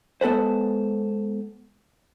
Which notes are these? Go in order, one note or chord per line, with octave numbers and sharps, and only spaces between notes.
G#3 B3 A4 B4 C5